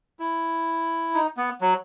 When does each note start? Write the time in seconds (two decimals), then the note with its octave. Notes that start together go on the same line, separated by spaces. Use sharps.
0.19 E4
1.14 D#4
1.37 B3
1.61 F#3